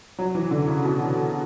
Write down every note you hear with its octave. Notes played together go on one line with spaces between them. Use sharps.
F#3
E3
D3
C#3
B2